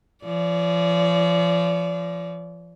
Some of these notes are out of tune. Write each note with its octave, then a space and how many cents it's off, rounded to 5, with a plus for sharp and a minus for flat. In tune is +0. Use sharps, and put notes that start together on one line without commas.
F3 -35 D5 -35